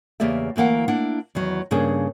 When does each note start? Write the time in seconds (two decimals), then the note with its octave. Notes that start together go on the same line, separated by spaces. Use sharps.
0.20 E2 C#3 A#3 G4 D5 E5
0.56 D2 E3 A#3 F5 F#5
0.88 A#3 D4 E4 F#5
1.35 E2 D#3 F#3
1.71 G2 C#3 A#3 D4 G#4